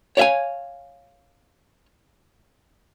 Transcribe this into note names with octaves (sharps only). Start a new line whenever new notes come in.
C#5 D5 E5 F5 G#5